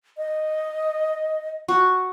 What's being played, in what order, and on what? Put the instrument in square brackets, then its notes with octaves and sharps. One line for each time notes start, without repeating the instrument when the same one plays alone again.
[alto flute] D#5
[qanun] F#4